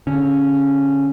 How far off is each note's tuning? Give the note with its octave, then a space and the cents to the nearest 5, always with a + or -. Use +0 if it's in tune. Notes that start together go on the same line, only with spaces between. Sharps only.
D3 -20 C#4 -5